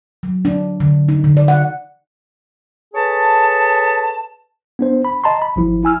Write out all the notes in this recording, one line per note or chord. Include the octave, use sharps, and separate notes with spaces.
F#3
D4
D3
D#4
D3
D5
F#5
G#4 A4 B4 C#5 A5
B3 D4 C5
B5
D#5 A5 A#5 C6
B5
G#1 F3 E4
E4 G#5 E6 F6